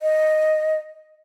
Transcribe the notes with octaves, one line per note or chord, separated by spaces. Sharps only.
D#5